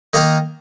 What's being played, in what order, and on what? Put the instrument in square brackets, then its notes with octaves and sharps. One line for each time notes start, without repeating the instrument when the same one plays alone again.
[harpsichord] D#3 A#3 D#4 A#4